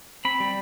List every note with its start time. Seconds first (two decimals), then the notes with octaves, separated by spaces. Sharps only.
0.25 C4 B5
0.40 G3